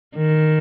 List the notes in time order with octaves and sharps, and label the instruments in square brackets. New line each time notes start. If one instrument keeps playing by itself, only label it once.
[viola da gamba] D#3